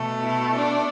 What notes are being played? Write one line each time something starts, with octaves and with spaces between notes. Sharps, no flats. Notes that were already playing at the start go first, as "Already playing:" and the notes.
Already playing: B2 A3
E4
D4